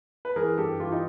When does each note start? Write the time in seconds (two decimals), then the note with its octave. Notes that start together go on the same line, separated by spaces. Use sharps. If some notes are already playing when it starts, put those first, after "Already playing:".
0.25 B4
0.36 E3 G#4 A#4
0.58 G2 G4 A4
0.80 E3 F4 G4
0.92 D#4